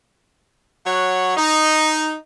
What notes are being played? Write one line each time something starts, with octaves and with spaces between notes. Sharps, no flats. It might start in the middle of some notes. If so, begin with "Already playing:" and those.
F#3 C#5 F#5
D#4